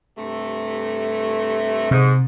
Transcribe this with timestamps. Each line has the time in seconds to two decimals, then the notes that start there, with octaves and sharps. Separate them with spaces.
0.18 G2 C3 A3
1.91 G#2 C3